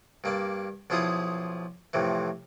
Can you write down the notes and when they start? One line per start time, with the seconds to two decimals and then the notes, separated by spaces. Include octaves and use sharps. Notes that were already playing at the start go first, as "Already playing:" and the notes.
0.24 G2 A#3 D5
0.90 B1 F3 E4 F4 G#4 D#6
1.93 F2 A2 C3 E3